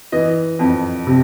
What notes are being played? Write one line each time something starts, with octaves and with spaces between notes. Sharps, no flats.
E3 D#5
F2
C3